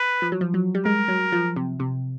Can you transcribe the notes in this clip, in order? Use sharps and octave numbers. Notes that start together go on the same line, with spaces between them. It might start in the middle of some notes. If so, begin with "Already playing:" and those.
Already playing: B4
F3
F#3
F3
F#3
G3
G#3 A#4
F#3
F3
C3
C3